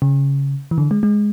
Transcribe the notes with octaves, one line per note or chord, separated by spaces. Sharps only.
C#3
E3
D3
G#3
G#3